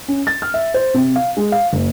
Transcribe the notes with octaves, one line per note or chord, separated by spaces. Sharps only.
C#4
A6
F6
E5
C5
C3
F5
G#3
F5
F#1